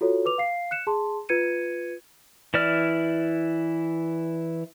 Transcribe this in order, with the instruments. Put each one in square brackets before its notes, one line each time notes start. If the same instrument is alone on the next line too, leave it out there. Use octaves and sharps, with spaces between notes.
[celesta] F4 F#4 A4 C#5
B4 D6 F7
F5 C7
F#6 C#7 E7
G#4 A5 C6
F4 B4 G#6 C#7 D#7
[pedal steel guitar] E3 E4 D5 F6